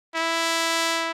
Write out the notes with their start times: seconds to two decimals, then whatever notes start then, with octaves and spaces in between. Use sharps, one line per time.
0.16 E4